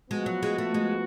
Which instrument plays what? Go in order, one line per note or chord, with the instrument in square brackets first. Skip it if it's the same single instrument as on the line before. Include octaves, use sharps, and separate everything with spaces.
[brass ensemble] F3 B3 F#4 [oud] G#3
[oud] F#3
G#3
A3
G#3